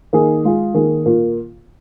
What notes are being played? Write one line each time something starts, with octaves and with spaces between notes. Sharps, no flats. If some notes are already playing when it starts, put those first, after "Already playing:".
D#3 A#3 D#4 G#4
G#3 F4 G#4
D#3 A#3 G#4
A#2 A#3